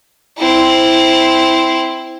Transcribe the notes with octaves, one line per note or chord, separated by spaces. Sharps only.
C4 E4